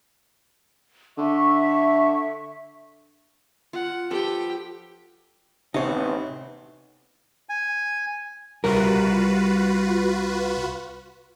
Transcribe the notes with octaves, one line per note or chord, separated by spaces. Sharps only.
D3 E5 C#6
F4 F#5
F3 G4 A4 B4 G5
A1 C3 B3 C4 D#4 C#5
G#5
C2 G3 F4 F#4 A#4 B4